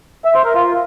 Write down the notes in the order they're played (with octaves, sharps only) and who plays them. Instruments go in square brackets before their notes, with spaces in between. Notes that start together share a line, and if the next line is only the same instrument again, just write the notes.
[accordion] E5
C5
A#4
F4